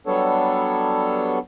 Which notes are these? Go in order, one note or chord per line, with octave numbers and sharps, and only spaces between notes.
F#3 G3 B3 D4 A4 C#5